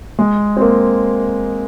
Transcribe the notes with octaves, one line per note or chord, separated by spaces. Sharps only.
G#3
C4
A#3